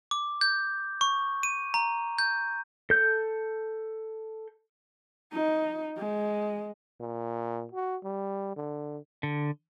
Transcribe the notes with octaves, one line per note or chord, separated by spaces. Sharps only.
D6
G6
C#6
D#7
A#5
G6
A4 G6
D#4
G#3
A#2
F#4
G3
D3
D3